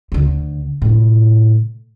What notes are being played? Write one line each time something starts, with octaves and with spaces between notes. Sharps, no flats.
D2 D3
A2 C3